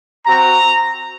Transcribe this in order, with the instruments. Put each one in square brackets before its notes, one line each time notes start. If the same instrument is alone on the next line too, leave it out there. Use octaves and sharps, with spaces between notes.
[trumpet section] C4 F#4 A#5